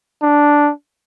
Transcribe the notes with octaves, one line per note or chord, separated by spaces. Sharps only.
D4